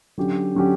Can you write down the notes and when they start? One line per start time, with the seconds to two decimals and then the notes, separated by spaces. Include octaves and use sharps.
0.18 D3 F#3 C#4 G4
0.55 D3 F#3 C#4 G4